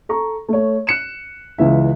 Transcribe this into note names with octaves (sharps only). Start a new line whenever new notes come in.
A4 A#5 C#6
A3 C#5
F#6 C#7 E7
C#2 C#3 E3 E5